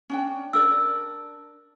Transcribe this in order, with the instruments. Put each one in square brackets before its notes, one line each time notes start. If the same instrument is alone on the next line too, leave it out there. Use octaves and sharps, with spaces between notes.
[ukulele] C#4 D4 G5
[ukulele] D4 A#4 D5 [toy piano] E6